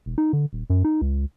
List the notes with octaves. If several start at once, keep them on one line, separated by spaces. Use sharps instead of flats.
E1
D#4
D3
D#1
F#2
D#4
C#2